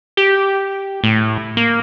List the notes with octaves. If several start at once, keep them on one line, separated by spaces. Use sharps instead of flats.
G4
A2
A#3